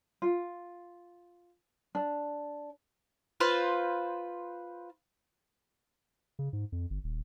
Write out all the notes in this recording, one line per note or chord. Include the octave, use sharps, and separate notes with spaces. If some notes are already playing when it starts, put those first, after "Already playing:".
F4
D4
F4 B4 C5
C#3
G#2
F2
G1
D#1